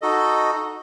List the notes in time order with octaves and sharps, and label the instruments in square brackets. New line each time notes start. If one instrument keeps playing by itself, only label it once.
[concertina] D#4 F#4 A4 D#5